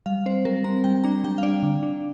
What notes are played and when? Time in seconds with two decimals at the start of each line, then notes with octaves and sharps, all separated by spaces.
0.06 G3 F5
0.26 C4 C5
0.45 G3 A#4
0.64 C4 A#5
0.84 G3 G5
1.04 D4 A#5
1.24 G3 G5
1.38 F5
1.43 D4 D5
1.63 D3
1.83 D4